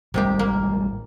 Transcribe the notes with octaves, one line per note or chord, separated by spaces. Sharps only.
A1 C3 D#3 G3 G#3 G4
A#3